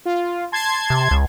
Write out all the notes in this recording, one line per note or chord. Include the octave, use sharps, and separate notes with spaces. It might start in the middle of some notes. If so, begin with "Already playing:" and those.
F4
A5 C6 G#6
C3
C#2